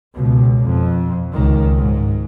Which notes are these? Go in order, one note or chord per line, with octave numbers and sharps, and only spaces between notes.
C#2 B2
F2
C#2 D#3
G#2